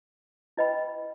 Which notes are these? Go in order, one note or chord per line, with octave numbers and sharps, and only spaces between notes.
E4 B4 D#5 G5 B5